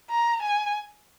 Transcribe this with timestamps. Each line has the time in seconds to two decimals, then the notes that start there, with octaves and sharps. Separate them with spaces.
0.10 A#5
0.42 G#5